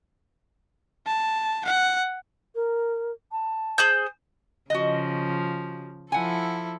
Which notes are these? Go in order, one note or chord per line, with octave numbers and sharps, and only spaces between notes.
A5
F#5
A#4
A5
G#4 C5 G6
C#3 F3 F#4 D#5
F3 E4 A4 F#5 G#5